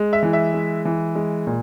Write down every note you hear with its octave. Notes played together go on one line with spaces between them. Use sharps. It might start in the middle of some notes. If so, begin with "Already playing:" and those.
Already playing: G#3
E5
E3
E5
G#3
E3
G#3
A#2